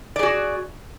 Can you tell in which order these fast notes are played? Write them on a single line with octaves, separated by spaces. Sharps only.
D5 G#4 F#4